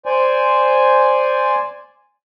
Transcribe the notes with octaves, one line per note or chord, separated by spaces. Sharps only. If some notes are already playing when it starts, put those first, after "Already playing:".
C5 D5 G#5